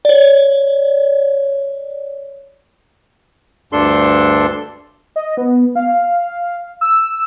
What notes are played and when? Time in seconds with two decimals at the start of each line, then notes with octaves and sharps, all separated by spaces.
0.05 C#5 D5
3.72 D2 G2 D4 A4 C6
5.16 D#5
5.37 B3
5.76 F5
6.81 E6